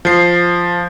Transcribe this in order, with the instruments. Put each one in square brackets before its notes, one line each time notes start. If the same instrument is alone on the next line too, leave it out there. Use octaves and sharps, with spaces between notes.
[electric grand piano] F3 C7